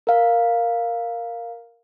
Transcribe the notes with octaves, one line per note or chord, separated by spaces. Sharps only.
A#4 F5